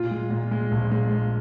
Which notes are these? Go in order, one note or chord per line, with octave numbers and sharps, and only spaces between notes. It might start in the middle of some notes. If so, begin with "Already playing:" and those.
Already playing: A#2 F4
G#3
A#2
G#3
A#1
G#3